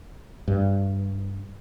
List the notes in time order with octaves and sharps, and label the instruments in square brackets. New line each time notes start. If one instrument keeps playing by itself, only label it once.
[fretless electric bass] G2